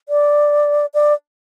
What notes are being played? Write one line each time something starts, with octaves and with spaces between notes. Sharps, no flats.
D5
D5